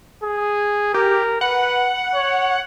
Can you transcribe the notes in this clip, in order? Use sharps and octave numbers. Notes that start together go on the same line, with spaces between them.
G#4
G4 A#4
B4 F#5
C#5